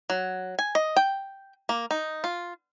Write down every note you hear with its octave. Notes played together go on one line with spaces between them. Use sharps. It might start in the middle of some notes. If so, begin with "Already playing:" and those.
F#3
G#5
D#5
G5
A#3
D#4
F4